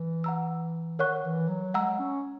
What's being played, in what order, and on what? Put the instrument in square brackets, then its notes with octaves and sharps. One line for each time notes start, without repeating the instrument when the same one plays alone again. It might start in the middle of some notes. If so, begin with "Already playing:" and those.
Already playing: [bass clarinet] E3
[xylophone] F#5 A#5 E6
[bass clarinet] D#3 [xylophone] A#4 C#5 F#5 C#6 F#6
[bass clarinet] E3
F#3
[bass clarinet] G#3 [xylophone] F#5 A#5 E6
[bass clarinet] C#4